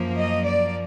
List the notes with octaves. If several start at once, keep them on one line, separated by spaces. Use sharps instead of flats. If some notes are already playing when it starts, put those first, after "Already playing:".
Already playing: F#2 F3 A#3
D#5
D5